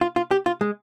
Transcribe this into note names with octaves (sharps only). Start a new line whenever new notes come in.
F4
F4
G4
F4
G#3